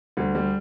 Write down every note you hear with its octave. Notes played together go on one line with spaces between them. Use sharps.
D2 G3
G3